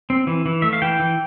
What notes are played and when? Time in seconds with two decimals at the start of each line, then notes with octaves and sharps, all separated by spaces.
0.10 C4
0.27 E3
0.46 E3
0.62 A3 E5
0.73 F5
0.82 E3 G5
1.00 E3